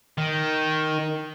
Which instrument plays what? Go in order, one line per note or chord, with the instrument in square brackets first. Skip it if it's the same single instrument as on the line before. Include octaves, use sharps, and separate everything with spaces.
[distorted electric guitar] D#3